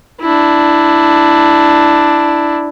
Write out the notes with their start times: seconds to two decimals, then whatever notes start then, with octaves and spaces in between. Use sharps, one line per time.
0.21 D4 E4